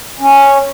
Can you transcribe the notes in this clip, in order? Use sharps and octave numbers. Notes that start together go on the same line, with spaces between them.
C#4